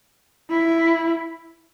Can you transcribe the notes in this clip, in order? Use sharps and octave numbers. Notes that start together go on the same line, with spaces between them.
E4